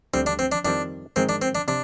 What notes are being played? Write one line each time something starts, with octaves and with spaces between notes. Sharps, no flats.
D2 D3 G3 C4
D4
C4
D4
F2 D#3 G3 C4 D4
G#2 D#3 G#3 C4
D4
C4
D4
C3 D4